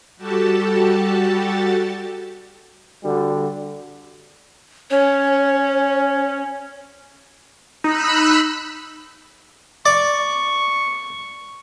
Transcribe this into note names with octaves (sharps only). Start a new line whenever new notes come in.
G3 F#4 G4 A4 A5
D3 G3 F#4
C#4 C#5
D#4 B5 E6 F#6
D5 C#6